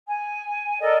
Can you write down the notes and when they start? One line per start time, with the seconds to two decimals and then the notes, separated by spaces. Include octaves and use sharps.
0.07 G#5
0.80 A4 A#4 D5 D#5